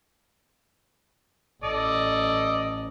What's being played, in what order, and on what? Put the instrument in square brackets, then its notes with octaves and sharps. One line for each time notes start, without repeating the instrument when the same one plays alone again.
[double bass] A1 [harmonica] A4 D5 D#5